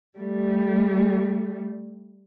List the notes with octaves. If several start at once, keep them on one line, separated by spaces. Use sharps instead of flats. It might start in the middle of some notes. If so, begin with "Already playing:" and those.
G3 A3